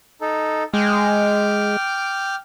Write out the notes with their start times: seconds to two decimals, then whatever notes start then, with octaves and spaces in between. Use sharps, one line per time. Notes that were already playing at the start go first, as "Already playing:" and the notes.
0.21 D#4 A4
0.74 G#3 G5 D6 F6